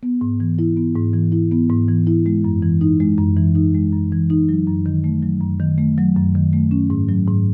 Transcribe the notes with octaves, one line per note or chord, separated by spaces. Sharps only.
B3
G#2
E3
E4
B3
G#2
E3
E4
B3
G#2
E3
E4
G#3
F#2
E3
D#4
G#3
F#2
E3
D#4
G#3
F#2
E3
D#4
F#3
F#2
D#3
A3
F#3
F#2
D#3
A3
F#3
F#2
D#3
A3
C#4
G#2
F#3
G#2